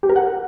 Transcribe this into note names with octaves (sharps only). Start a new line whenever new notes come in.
G4
A#4
F#5